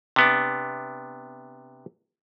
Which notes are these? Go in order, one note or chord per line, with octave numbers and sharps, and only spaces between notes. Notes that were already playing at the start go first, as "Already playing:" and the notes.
C3 B3 D4